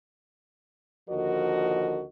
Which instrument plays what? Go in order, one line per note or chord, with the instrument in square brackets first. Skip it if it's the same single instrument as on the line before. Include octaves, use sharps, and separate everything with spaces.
[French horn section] D#2 D3 F3 F#4 A#4 D#5